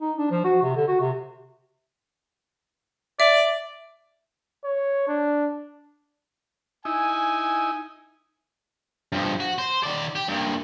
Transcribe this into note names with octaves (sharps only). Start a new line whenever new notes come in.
D#4
D4
F3
F#4
C3
D3
F#4
C3
D5 E5
C#5
D4
D#4 E4 G#5
G2 F3
F#4
C5
D#3 D5
G4
G2 A#2